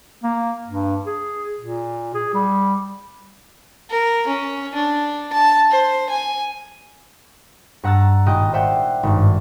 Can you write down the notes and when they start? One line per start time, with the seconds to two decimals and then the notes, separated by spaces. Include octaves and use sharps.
0.23 A#3
0.67 G2
1.06 G#4
1.60 A#2
2.14 G#4
2.34 G3
3.91 A#4
4.28 C#4
4.75 D4
5.33 A5
5.72 C5
6.10 G#5
7.84 G2 F#5 A#5 E6 F#6 A6
8.26 G#1 A#2 G4 D#5 G5 F#6
8.53 C5 D5 E5 F#5 G5
9.03 G#1 G2